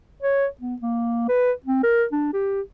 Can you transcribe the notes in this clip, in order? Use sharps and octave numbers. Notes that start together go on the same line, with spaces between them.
C#5
B3
A#3
B4
C4
A#4
D4
G4